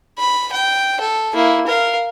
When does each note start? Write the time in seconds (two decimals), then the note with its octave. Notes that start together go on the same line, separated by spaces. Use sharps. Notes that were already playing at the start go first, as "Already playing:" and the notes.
0.18 B5
0.53 G5
1.01 A4
1.35 A#3 E4
1.67 A#4 F5